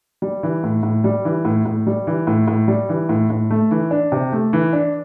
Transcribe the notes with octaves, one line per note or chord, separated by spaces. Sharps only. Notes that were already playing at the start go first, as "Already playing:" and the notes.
G3
E3
A2
A2
G3
E3
A2
A2
G3
E3
A2
A2
G3
E3
A2
A2
A3
E3
D4
C3
A3
E3
D4